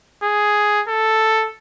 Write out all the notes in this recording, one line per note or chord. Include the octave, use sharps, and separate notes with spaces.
G#4
A4